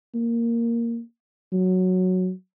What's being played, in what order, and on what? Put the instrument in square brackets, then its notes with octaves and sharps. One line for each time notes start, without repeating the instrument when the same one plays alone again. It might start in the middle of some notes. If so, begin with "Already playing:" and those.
[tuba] A#3
F#3